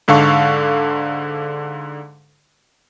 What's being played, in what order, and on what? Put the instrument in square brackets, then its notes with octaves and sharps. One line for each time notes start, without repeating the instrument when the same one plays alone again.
[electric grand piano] G#2 D3 A4 F5 C#6